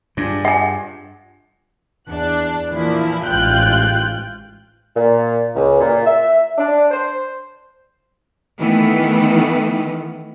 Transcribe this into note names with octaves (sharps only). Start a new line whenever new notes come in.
G2 D4 F4 G#4
F#5 G#5
E2 D4 F#6
A#2 E3 F3 A#3 E4
A1 G#2 F4 G5 F#6 G6
A#2
C#2
A#2
E5
D4
C5
D#3 E3 A3 B3